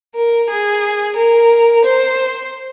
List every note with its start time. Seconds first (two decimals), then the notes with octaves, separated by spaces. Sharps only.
0.15 A#4
0.49 G#4
1.17 A#4
1.85 C5